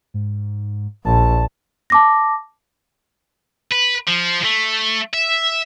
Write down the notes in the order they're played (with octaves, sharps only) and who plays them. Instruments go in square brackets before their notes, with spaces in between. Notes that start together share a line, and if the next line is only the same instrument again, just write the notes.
[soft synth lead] G#2
[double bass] A#1 [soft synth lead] A5
[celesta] A5 D6 A#6
[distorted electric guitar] B4
F3
A3
E5